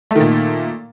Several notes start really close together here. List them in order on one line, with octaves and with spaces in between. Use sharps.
A3 D#3 A#2